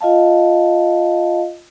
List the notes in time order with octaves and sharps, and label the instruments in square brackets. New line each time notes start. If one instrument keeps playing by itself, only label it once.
[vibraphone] F4 D#5 F5 A5